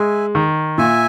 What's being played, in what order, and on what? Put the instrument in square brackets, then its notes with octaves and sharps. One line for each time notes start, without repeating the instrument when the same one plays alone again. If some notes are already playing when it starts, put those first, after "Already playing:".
Already playing: [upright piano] G#3 [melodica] E5 G#5
[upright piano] D#3
[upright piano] A#2 [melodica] E5 G#5